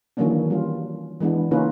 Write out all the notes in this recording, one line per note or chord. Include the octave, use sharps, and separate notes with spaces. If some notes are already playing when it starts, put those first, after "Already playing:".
D#3 E3 F#3 A#3 C#4 D4
G3 C#4 F4
E3 G#3 B3 D4
C#3 A#3 C#4 D#4 F4 B4